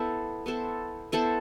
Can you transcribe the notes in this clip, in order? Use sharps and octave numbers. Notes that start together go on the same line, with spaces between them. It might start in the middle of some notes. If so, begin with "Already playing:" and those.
Already playing: B3 E4 A4 C5
B3 E4 A4 C5
B3 E4 A4 C5